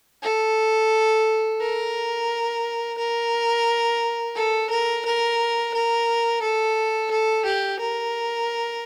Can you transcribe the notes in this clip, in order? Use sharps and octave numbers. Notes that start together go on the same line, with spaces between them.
A4
A#4
A#4
A4
A#4
A#4
A#4
A4
A4
G4
A#4